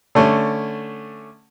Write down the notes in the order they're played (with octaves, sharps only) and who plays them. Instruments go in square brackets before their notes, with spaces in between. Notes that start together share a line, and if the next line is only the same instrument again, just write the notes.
[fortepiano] D3 A3 C#4